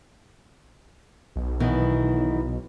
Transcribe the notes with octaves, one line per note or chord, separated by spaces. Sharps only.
B1
B2 D#3 E3